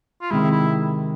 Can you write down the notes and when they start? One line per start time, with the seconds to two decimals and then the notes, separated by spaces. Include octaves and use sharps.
0.22 F4
0.31 C3 D#3 G#3 E4
0.51 E4